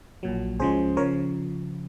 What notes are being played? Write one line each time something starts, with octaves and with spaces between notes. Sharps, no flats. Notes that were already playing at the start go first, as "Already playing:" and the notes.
A#1 A#2 F#3
C#2 C#3 F3 G#3 G#4 C5
C#3 F3 A#4 C#5